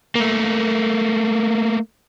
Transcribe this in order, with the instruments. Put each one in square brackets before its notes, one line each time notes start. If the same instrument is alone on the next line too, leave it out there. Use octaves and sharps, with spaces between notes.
[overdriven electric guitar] A3 A#3